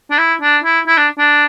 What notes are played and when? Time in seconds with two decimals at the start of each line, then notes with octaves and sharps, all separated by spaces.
0.11 D4
0.18 E4
0.41 D4
0.64 E4
0.87 E4
0.98 D4
1.19 D4